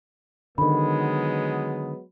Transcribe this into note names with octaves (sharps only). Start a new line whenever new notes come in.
D3 D#3 F#3 G#3 B3 B5